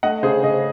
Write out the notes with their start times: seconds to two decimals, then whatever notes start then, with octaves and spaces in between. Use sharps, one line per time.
0.03 A3 D#5 F#5
0.23 C#3 G#4 C5
0.43 C#3 C5 D#5